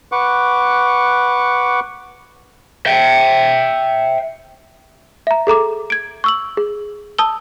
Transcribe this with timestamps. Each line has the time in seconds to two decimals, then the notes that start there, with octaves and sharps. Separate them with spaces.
0.12 B4 F#5 C#6 D6
2.86 E5 G5
5.27 E5 A#5
5.47 G#4 A4 A#5 D6
5.90 G#6 D7
6.24 C#6 E6 F#7
6.57 G#4
7.18 A5 D#6 E6 G7